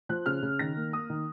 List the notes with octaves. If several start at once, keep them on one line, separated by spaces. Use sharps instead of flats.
F3 F#6
C#3 F6
C#3
D#3 A#6
A#3
A#3 D#6
D#3